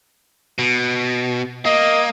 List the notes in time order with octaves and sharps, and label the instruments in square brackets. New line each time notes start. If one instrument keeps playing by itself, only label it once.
[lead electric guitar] B2
[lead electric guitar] A#3 [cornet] D#5